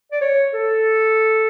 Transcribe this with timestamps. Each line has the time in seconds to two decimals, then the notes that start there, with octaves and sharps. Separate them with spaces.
0.12 D5
0.22 C#5
0.53 A4